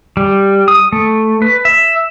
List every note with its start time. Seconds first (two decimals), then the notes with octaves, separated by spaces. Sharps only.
0.17 G3
0.68 D#6
0.93 A3
1.42 B4
1.65 E5